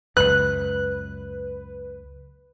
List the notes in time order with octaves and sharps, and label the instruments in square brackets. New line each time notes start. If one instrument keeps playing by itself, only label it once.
[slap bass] C#2 F#2 [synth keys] B4 [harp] F#6